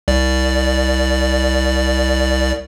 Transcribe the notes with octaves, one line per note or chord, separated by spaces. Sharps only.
C2 D5